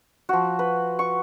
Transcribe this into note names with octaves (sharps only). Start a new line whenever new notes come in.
F3 F#4
B4
C#6